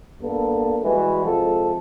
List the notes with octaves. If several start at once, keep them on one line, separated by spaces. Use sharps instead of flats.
G2 A#3 B3 A4
E3 G3 G#3 F#4 B4
C3 F3 G#3 A4